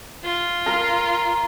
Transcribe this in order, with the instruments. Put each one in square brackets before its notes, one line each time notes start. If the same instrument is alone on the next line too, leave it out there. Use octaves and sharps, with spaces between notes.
[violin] F4
[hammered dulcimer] A#4 A#5